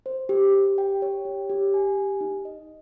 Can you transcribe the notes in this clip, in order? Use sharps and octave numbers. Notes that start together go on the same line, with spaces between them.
C5
G4
G4
G5
C#5
G4
G4
G#5
G4
D#4
D#5